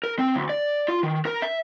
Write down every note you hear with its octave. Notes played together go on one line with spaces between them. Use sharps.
A#4
C4
D2
D5
F4
D#3
A#4
E5